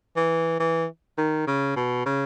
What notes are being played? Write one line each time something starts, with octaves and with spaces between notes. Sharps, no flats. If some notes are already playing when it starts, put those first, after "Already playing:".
E3
E3
D#3
C#3
B2
C#3